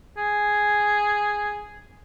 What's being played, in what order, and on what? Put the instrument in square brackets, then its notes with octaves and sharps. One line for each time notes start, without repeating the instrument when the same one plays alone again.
[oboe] G#4